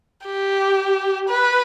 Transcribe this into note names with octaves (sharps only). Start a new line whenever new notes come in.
G4
B4